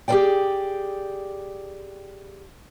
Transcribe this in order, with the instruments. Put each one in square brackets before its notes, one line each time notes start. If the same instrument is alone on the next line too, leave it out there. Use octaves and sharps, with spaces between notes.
[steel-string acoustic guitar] G4 G#4 A#4 C5 D5 G5